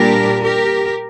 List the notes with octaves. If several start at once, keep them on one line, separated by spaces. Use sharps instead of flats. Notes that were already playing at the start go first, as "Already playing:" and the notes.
Already playing: A#2 G3 D4 G4 A#4
G4 A#4